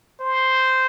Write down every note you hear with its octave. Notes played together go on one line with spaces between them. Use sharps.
C5